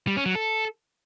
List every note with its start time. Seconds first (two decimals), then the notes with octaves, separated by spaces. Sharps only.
0.07 G3
0.17 C#4
0.26 F#3
0.35 A4